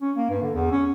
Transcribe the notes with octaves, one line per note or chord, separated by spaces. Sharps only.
C#4
A#3
G2
D3
E2
C#4